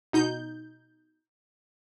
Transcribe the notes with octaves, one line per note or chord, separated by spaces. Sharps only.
B2 D#4 G6